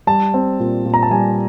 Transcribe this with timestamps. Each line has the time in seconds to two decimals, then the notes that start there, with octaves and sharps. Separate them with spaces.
0.07 G3 A5
0.34 C4
0.60 A#2
0.85 A#2
0.94 A#5
1.03 A5
1.11 G3 G#5